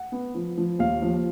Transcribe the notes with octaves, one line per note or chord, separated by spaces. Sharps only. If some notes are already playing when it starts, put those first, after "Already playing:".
Already playing: F#5
B3
F3
F3
D#2 F5
F3